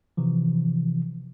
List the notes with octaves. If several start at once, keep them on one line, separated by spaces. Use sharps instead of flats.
C3 E3 F3